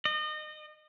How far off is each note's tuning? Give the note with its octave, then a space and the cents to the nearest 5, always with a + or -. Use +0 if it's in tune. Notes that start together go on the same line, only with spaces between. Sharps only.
D#5 -30